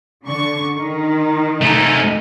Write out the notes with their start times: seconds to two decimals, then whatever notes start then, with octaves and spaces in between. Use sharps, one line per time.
0.23 D3 C#6
0.73 D#3
1.61 A3 D#4